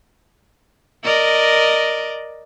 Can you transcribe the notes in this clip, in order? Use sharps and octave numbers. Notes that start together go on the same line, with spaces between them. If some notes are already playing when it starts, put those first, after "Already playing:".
A#4 D5 D#5